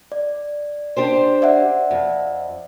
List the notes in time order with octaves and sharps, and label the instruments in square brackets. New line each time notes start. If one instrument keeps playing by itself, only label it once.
[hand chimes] D5
[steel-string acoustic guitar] D4 G4 C5
[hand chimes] D5 E5 F#5
[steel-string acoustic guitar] F2